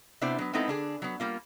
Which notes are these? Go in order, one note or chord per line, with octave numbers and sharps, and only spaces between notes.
C3 B3 D4 E4 C5 D5
F#3 B3
G#3 B3 C4 D#4 E4 A4
D3 D4 G#4
F#3 B3
G3 A#3 F4